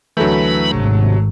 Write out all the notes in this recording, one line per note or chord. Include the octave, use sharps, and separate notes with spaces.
D2 E3 F#3 A3 A4 B5 G6
G#1 C3